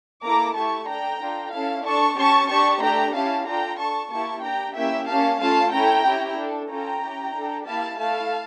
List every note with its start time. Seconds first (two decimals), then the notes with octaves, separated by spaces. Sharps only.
0.23 A#3 E4 A4 A#5 D6
0.55 A3 E4 G4 A5 C#6
0.87 D4 A4 G5 A#5
1.20 D4 F4 A4
1.52 C#4 E4 A4 F5 A5
1.84 D4 A4 A5 C#6
2.16 C#4 G4 A5 C#6
2.48 D4 G4 A5 C#6
2.81 A3 D4 G4 G5 A#5
3.13 C#4 E4 G4 F5 A5
3.46 D4 F4 A4 G5 A#5
3.78 D4 A4 A5 C#6
4.10 A#3 E4 G4 A5 C#6
4.43 D4 G4 G5 A#5
4.75 A#3 C#4 E4 G4 E5 G5
5.07 A#3 C#4 G4 F5 A5
5.39 A3 C#4 F4 A4 F5 A5
5.72 C#4 E4 A4 G5 A#5
6.04 C#4 E4 G4
6.37 D4 A4
6.69 C#4 F4 A4 G5 A#5
7.01 C#4 E4 G4
7.33 D4 A4
7.65 A#3 E4 G4 F5 A5
7.98 A3 E4 A4 F5 A5